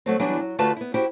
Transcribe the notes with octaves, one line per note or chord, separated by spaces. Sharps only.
F#3 A3 C4
E3 F#3 G3 B3 D4
F#3
D3 A3 F4 F#4 B4 A5
B3 E4
E4 F#4 G4 C5 G5